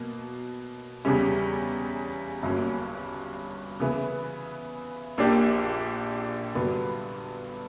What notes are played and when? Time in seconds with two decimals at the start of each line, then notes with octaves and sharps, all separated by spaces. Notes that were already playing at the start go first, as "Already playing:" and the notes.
Already playing: B2 F#3 A#3
1.05 E2 C#3 G3 C#4
2.42 G1 G2 F#3 A#3 C#4
3.80 C#3 E3 B3
5.18 A#1 A#2 A#3 D4 G4
6.55 G2 D3 F#3 B3